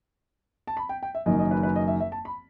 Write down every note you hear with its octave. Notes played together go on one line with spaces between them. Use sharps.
A5
B5
G5
G5
E5
F#1 F#2 D#3 D#5
D#5
B4
B4
D#5
E5
E5
A5
B5